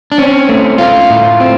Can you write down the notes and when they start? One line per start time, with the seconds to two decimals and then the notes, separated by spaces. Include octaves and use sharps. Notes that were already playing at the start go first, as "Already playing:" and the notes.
0.12 D4
0.18 C4 C#4
0.49 A3
0.78 A3 F4
1.10 A2
1.40 C4